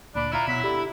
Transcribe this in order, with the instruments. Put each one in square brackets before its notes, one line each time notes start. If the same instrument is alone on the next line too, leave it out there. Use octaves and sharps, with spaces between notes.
[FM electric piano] D2 A#2 D6 [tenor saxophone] D4 [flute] B5
[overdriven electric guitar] E4 [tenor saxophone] F4 [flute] A#5
[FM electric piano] B2 C6 D6 [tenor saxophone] F#3 [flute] B6
[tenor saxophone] D3 [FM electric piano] G4 [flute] B5